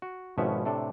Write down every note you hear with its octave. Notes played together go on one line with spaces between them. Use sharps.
F#4
G#1 B2 F3 B3 C#4 E5
A2 C3 D4 A4